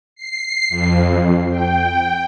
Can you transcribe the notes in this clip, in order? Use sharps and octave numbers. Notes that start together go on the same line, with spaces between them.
C7
F2
G5